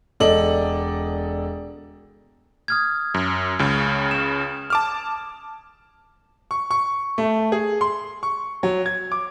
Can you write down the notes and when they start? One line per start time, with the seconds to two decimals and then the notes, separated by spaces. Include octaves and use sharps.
0.20 E1 A4 D5 D#5 F#7
2.68 D#6 F6 G#6
3.14 F#2
3.59 C#2 C#3
4.11 E7
4.70 A5 D6 F6
6.51 C#6
6.71 C#6
7.18 A3
7.52 G#4
7.81 C6
8.23 C#6
8.63 F#3
8.86 G#6
9.12 D6